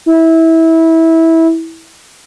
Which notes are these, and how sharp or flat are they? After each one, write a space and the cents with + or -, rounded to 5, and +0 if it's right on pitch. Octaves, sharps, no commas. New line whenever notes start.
E4 -20